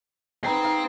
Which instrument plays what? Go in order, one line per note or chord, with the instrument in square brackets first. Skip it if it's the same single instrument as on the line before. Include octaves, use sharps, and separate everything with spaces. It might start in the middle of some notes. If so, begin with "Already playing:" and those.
[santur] B3 D#4 G#4 [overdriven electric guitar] C4
[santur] D#4 D#5 F5